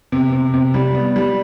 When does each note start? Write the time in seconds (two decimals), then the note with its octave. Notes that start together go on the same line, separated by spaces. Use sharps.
0.12 C3
0.32 C3
0.54 C3
0.74 G3
0.95 B3
1.16 G3